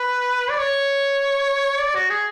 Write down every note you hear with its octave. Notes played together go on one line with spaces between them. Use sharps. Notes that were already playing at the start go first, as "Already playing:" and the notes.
Already playing: B4
D5
C#5
D5
F#4
G#4